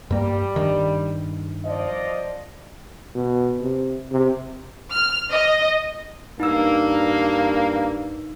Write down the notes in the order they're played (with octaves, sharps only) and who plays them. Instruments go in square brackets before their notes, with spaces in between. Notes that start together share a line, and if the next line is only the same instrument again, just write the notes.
[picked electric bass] G2 A#3 [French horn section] G3
[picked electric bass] G2 D#3
[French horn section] F3 D5 D#5
[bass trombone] B2
C3
C3
[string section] F6
D#5
[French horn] G2 [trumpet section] A#3 [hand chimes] D#4 E6